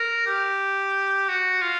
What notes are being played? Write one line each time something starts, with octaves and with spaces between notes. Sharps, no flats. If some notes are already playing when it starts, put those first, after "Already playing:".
Already playing: A#4
G4
F#4
F4